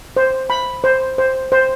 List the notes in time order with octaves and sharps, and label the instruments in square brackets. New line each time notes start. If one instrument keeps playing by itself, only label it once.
[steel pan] C5
B5
C5
C5
C5